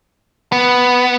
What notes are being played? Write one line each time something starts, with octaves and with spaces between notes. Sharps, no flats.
B3